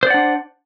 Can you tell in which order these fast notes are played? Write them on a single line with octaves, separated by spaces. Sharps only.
C5 D5 F#5 D4